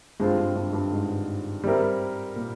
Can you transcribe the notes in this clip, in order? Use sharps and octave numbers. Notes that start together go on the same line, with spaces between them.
G2 G#3 C4 F4
G2
G2
G2
G#2
G3 C4 E4 A#4
A#2